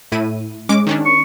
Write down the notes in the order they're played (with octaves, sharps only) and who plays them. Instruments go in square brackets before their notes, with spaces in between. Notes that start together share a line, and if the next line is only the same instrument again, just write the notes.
[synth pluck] A2 E4 D#7
G#3 C#4 D6
D#3 C#4 D4
[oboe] C#6